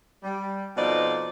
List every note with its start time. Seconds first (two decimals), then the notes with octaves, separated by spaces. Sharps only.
0.24 G3
0.77 F2 B2 F3 D#4 C5 D5